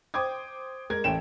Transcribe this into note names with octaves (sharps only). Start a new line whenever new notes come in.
C5 G5 D6 D#6 G#6
G#3 A#4 G#6
A1 A3 G5 E7